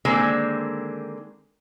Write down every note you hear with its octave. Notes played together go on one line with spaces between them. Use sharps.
D3 D#3 G#3 A#3 C4